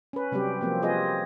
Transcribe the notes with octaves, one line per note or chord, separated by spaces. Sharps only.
C#4 B4
C3 F#3 G3 C4 G4
F3 A#3 C4
C4 F4 G#4 B4 D#5